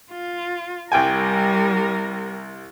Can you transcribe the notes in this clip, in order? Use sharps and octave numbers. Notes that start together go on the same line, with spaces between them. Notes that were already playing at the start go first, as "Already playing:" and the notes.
F4
C2 G3 A#4 G5 G#5